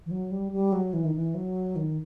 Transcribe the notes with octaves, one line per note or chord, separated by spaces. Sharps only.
E3
F#3
G3
G3
F#3
E3
D#3
E3
F#3
D#3